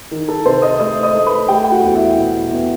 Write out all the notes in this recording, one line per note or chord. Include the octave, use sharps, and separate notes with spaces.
D#3
A4 A5
C3 C5 C6
D#5 D#6
A3 D#5 D#6
D#5 D#6
A3
B4 B5
A3 G4 G5
G5
F#4 F#5
E2
E4 E5
B2
B2